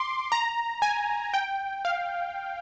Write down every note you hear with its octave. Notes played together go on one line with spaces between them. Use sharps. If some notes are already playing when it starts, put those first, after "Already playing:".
Already playing: C6 D6
A#5
G#5
G5
F5